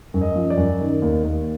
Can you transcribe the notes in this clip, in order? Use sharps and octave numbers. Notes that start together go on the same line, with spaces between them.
F#2
D#5
F3
D5
F#2
D#3
D#2
D#2